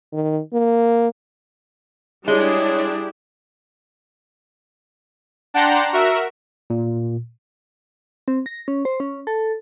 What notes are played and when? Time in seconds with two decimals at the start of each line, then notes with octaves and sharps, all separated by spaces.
0.13 D#3
0.53 A#3
2.28 G3 G#3 D4 E4 G4 G#4 C#5
5.54 D4 F#5 G5 A5 A#5 C6
5.93 F#4 A#4 E5
6.70 A#2
8.28 C4
8.46 A#6
8.68 C#4
8.85 C5
9.00 C#4
9.27 A4